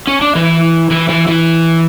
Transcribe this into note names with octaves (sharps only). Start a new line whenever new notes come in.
C#4
D4
E3 E4
E3 E4
E3 E4
E3 E4